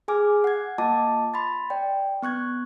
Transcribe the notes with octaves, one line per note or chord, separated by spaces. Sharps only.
G#4 G#5 D6 F6
F#5 G#6
A#3 F4 D#5 A5 D6
B5 C6 A6
D5 G5
B3 C#6 F#6 G#6